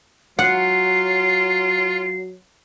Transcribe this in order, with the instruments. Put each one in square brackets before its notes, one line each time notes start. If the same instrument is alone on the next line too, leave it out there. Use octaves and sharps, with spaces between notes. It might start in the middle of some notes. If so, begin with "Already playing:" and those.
[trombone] F#3 [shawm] F4 [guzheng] F#5 [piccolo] C7